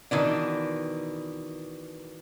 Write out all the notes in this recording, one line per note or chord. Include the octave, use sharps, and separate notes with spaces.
B2 D#3 E3 D4